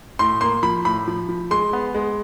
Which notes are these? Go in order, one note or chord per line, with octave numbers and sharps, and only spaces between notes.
A2 C6
A#3 C6
F3 B5
A2 B5
F3
F3
G#3 C6
B3
G#3